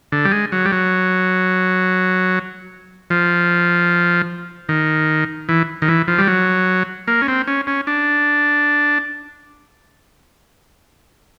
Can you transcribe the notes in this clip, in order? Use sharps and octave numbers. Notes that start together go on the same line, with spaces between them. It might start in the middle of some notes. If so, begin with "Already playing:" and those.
D3
G3
G#3
F#3
G3
F#3
F3
D#3
E3
D#3
E3
F3
G3
F#3
A#3
C#4
C4
C#4
C#4
D4